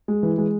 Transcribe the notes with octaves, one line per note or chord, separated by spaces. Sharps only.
G#3
E3
G#3